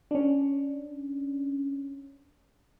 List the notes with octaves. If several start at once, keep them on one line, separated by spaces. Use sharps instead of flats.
C#4 D4